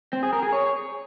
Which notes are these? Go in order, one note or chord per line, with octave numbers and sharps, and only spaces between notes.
C4
G#4
A#4
G#4
C#5